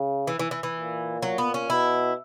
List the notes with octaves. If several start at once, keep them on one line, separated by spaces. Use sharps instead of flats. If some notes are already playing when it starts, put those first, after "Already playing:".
Already playing: C#3
E3
E3
E3
E3
A#2
F#3
B3
C#4
B2 E4